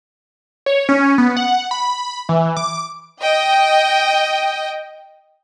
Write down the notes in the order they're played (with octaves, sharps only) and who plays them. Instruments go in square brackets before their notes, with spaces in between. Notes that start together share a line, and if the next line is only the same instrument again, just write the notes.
[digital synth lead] C#5
C#4
B3
F#5
B5
E3
D6
[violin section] D#5 G5